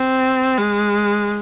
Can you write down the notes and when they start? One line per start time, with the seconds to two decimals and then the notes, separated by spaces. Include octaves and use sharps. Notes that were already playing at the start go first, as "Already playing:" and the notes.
Already playing: C4
0.58 G#3